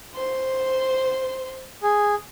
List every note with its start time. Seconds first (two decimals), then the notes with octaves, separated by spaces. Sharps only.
0.14 C5 C6
1.83 G#4